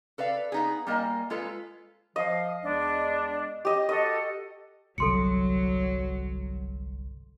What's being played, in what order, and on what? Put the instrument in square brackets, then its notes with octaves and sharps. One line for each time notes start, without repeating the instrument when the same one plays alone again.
[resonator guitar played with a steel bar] A4 B4 D5 F5
B3 D#4 G#4
G3 A#3 A#4 D#5 G#5
G#3 F4 A4 B4
[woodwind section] F3 F5 [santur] D#5
[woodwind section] E2 G#3 D4
[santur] G4 D#5
[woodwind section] F#4 A4 [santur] D#5
[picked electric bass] G1 C2 [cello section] F#3 [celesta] A4 C6 C#7